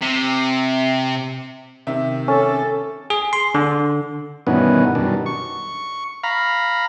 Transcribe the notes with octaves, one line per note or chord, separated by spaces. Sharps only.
C3
C3 D#3 E5
C#4 A4
G#4
C6
D3
G2 B2 D#3 E3 B3 C#4
F#2 B2 D#3 G3 D4
C#6
F5 A#5 B5